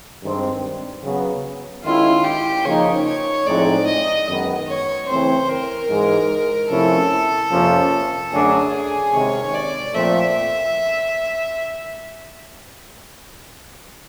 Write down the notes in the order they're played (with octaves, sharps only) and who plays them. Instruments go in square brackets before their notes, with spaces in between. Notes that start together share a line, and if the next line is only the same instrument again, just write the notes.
[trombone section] G2 D#3 G#3 C4
C#3 F#3 B3
[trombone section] D#3 G#3 C#4 E4 [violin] F4
[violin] G4
[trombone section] C#3 F3 A#3 D#4 [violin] C#5
[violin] C#5
[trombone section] A2 F3 G#3 C4 D#4 [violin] D5
[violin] D#5
[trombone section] F#2 D#3 G#3 B3
[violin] C#5
[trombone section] C#3 E3 A3 C4 [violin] C5
[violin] A#4
[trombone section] G#2 E3 G#3
[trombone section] C3 F3 A3 C#4 E4 [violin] A4
[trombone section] F2 C3 F3 A#3 C#4
[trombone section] F#2 D3 F#3 A3 D4 [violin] G#4
[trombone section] C3 D#3 G#3 C#4 [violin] C#5
[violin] D5
[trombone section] A#2 F3 A3 C4 [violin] E5